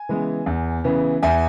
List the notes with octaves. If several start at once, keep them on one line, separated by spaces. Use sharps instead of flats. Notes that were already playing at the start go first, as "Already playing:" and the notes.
Already playing: G#5
C#3 E3 G#3 B3
E2
C#3 E3 B3
E2 E5 G#5